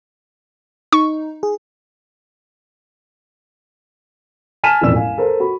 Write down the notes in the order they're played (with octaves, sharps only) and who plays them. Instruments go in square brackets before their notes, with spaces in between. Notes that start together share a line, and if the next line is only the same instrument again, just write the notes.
[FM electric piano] D#4 [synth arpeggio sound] C#6
[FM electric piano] G#4
[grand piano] G#5 A5 F6 B6 D#7 E7
E1 A1 F2 D5 E6 E7
F5 G#5
A4 A#4 C5
F#4 B5